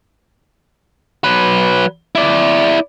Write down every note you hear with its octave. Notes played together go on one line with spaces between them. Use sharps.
F#3 B4
E4 D5